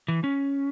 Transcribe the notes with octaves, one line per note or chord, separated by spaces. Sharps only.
E3
C#4